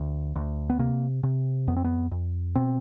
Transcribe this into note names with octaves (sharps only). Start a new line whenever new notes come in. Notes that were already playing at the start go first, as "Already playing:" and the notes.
Already playing: D2
D2
B3
C3 A#3
C3
F2 B3
C4
B3
F2
B2 C4